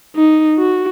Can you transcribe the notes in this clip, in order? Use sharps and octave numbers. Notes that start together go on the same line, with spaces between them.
D#4
F#4